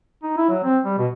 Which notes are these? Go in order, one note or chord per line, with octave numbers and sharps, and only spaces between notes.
D#4
E4
F#3
C4
G3
B2